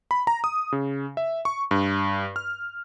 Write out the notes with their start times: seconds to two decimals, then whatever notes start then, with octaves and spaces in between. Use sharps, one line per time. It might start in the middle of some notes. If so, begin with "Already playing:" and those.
0.11 B5
0.27 A#5
0.44 D#6
0.72 C#3
1.17 E5
1.45 C#6
1.71 G2
2.36 F6